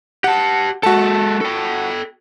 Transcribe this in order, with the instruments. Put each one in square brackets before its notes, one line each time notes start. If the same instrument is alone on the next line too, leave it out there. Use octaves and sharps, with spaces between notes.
[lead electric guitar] G4 A5 [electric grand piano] F#5
[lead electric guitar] G#3 A4 [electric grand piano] F#4 A5
[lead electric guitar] A4 G5